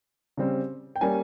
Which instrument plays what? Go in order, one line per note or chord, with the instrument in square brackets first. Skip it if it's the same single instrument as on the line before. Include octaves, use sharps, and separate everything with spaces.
[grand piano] C#3 G3 C4
G5
G3 A#3 C#4 G#5